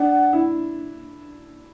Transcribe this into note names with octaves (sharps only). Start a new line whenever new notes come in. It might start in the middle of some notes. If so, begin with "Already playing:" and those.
Already playing: D4 F#5
E4